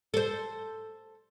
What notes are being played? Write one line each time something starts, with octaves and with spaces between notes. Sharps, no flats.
A4 C5